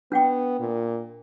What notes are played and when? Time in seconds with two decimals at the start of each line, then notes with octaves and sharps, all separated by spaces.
0.12 B3 D4 F#5 G5
0.60 A#2